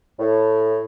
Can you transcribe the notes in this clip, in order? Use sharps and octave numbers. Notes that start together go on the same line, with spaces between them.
A2